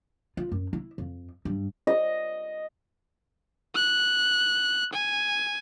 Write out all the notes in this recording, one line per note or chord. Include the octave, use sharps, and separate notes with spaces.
F4
F#2
E4
F2
G2
D#5
F#6
G#5